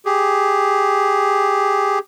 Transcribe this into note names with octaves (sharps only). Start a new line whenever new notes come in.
G4 G#4